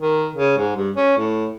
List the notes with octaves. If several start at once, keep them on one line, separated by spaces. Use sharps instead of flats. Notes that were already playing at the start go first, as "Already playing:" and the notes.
D#3
C#3
G#2
G2
C#4
A2